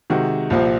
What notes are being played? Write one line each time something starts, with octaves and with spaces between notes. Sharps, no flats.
C3 D#3 G#3 F#4
C2 A#2 F3 C4